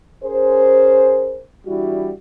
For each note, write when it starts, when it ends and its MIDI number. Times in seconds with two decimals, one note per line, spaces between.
0.23 1.41 61
0.23 1.41 68
0.23 1.41 70
0.23 1.41 72
1.66 2.12 52
1.66 2.12 55
1.66 2.12 62
1.66 2.12 64
1.66 2.12 66